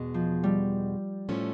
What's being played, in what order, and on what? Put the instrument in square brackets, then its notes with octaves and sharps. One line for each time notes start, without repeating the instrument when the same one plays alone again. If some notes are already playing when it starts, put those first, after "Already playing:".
Already playing: [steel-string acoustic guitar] E2 B2 G#3
[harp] F3
G3
[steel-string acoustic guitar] A2 F3 A3 C#4